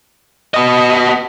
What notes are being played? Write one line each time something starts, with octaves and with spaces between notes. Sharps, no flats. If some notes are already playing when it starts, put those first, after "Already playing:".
B3 D#5